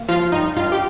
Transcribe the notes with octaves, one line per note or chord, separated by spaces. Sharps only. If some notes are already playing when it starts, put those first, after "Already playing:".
Already playing: A#3
F3 F4
G2 D#4
G2 F4
G4